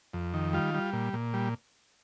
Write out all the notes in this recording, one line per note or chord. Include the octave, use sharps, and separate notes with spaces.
F2
D#3
G3 F4
G3
A#2
A#2
G3